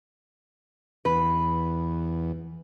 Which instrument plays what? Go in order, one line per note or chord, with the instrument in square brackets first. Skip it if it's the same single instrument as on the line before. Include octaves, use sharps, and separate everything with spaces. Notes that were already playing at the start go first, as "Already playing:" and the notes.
[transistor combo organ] E2 [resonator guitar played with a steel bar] B4